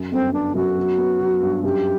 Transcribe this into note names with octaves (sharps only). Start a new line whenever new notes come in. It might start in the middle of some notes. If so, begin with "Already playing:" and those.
Already playing: F#2
G1 C4
B3 D4
F#2 F#4
F#3
B3
F#3
G2
F#2 G4